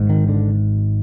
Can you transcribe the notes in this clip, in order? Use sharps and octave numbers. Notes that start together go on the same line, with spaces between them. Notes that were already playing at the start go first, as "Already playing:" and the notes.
Already playing: G#1 G#2
D#3
D3